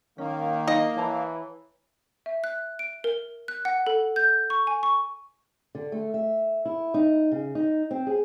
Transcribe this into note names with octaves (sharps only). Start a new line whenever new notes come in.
D#3 A#3 C#4
D#4 D#5 F5 A#5
E3 C#5 A5 A#5
E5
F#6
D7
A#4
F#6
F#5
A4
G6
C#6
G#5
C#6
D3
A3
E5
E4
D#4
C#3
D#4
C4
G#4